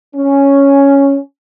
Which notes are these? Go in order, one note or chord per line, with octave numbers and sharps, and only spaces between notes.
C#4